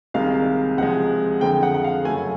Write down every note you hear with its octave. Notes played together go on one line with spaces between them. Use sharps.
C2 C3 D#3 G#3 F5
C#2 C3 F3 G#3 F#5
F2 D3 F3 G#3 G5
F#5
F#5
F5
F#2 C#3 F#3 A3 G#5